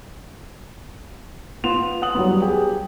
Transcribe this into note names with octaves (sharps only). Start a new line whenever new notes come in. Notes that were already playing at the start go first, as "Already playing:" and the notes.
B3 F4 C6 E7 F7
F#5 D#6 F#7
F#3 G3 B3
G4 G#4